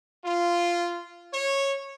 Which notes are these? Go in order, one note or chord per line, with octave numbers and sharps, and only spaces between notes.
F4
C#5